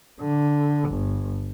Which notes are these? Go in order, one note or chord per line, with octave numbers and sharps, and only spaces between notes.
D3
G1